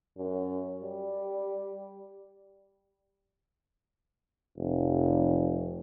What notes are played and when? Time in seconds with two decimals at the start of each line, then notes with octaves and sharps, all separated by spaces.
0.17 F#2
0.81 G3
4.58 F1